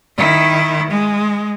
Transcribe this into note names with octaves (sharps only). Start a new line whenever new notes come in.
D#3 E4
G#3